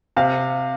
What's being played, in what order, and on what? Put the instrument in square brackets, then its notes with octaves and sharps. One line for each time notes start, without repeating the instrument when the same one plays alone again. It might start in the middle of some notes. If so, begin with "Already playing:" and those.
[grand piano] C3 F5